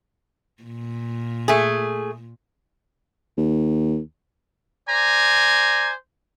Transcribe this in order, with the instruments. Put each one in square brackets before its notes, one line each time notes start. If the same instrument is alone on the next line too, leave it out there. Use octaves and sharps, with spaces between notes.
[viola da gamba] A#2
[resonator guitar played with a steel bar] A3 G#4
[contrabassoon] D#2
[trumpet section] C5 D5 G#5 [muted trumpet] A#5